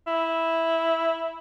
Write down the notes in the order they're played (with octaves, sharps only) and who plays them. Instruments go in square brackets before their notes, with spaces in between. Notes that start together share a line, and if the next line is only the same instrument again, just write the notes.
[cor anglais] E4